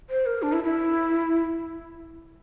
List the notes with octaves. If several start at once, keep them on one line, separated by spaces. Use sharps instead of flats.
C5
A#4
D4
E4
E4